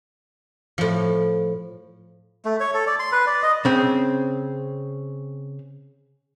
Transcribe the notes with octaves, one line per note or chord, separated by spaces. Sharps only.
A2 F3
A3
C#5
A4
D5
C6
B4
D5
D#5
C#3 C4